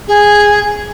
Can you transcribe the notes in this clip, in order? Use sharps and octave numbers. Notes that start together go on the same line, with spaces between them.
G#4